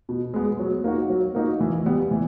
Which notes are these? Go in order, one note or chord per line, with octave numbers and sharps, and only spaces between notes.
B2
G#3 B3
F#3
A#3 D#4 F#4
F#3
A#3 D#4 F#4
E3
G3 B3
E3